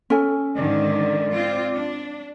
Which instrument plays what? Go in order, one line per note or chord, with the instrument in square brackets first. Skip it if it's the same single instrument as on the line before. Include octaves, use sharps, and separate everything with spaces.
[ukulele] C#4 A4 G#5
[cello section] G#2 D3 D#3 [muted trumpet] D5
[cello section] C4 F4
D4